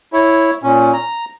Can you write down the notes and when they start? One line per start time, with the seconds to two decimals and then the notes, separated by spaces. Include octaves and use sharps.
0.13 E4 C#5
0.63 A#2 C#4
0.93 A#5